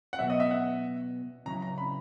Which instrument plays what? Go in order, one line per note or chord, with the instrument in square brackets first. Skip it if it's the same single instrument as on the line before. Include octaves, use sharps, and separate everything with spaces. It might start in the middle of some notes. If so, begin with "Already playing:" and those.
[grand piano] F#5
[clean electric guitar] B2 F#3 B3 F#4 [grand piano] E5
[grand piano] D#5
E5
F#5
[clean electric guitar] C#3 F#3 C#4 E4 [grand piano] A#5
[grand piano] A#5
B5